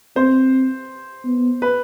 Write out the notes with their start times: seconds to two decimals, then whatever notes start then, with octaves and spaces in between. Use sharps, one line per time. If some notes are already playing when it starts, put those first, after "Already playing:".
0.16 C4 C5
1.25 B3
1.62 B4